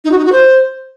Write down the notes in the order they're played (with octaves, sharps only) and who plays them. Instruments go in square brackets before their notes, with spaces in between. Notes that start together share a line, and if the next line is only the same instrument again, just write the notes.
[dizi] D#4
F#4
D#4
F#4
C5